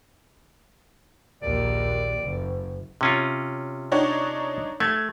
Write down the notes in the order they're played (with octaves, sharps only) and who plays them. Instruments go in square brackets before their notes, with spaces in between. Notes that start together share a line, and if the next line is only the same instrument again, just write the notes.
[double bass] A#1 D#2 [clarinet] D5
[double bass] F#1
[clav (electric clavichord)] C3 C#4 F4
[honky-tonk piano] D4 D#4 C#5
[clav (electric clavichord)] A3 [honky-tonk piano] G#6